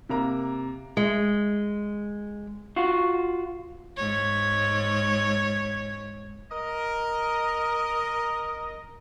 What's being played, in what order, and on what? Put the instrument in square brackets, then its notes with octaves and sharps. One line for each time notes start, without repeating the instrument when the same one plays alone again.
[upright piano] C3 A#3 A#5
[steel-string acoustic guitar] G#3
[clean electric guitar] F4 F#4
[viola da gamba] G#2 C#5
[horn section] A#4 D#5